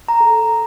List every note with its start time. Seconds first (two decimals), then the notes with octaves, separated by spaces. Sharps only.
0.08 A#5
0.20 A4